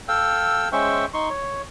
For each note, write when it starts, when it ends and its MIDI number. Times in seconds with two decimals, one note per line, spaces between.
0.08 0.69 69
0.08 0.69 77
0.08 0.69 79
0.08 0.69 88
0.72 1.05 56
0.72 1.05 61
0.72 1.05 72
0.72 1.05 76
0.72 1.05 79
0.72 1.05 85
1.14 1.29 63
1.14 1.29 84
1.14 1.29 85
1.30 1.62 73